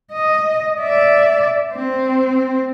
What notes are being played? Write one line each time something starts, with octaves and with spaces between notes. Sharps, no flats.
D#5
D5 E5
C4